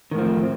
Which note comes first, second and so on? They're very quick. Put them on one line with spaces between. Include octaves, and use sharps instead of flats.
D#3 A2 F3 C4